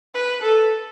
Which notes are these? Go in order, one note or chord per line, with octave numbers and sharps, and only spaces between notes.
B4
A4